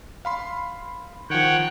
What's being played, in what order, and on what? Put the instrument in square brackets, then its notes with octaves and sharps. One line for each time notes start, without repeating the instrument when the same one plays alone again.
[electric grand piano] F5 B5 C6
[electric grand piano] D#3 F3 [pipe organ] C#5 F#5 G5